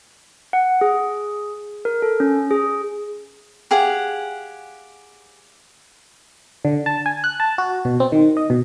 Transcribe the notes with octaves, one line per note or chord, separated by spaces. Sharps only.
F#5
G#4
A#4
A4
C#4
G#4
G4 G#4 F5 F#5
D3
A5
G#5
F#6
A5
F#4
B2
C4
D#3
D#5
B2